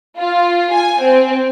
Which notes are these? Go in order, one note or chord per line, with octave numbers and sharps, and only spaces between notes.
F4
G#5
C4